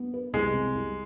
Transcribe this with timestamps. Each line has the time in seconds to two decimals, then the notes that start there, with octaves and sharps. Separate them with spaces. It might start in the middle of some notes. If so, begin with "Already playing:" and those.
Already playing: B3
0.14 B4
0.33 C2 G#3
0.54 C3
0.74 C2